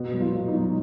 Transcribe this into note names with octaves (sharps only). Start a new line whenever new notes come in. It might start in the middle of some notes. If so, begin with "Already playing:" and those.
Already playing: B2 F#4
F#3
F4
B2
D#4
F#3